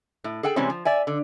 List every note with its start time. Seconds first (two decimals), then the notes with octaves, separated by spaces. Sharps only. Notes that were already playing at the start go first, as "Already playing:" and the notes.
0.24 A2
0.43 G#4 A4 F#5 G5
0.56 C3 E3 G3 G#3 C4 C#4
0.70 F3
0.85 D5 E5 G#5
1.07 D3